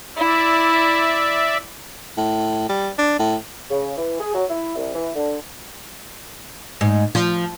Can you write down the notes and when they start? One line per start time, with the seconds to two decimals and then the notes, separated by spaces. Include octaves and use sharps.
0.17 E4 D5 E5
2.17 A2
2.69 G3
2.98 D4
3.19 A2
3.71 C#3
3.98 E3
4.20 G#4
4.34 F#3
4.49 E4
4.76 C2
4.95 E3
5.15 D3
6.81 G#2
7.15 F3